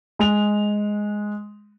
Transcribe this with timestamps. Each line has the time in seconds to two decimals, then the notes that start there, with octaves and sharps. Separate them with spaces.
0.19 G#3 F7